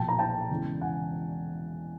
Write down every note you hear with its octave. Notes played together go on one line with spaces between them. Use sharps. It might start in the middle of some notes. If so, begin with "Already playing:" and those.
Already playing: B1 A#2 F3 G5 A5
A#5
G5 A5
E1 E2 C#3 E3
F#5 G#5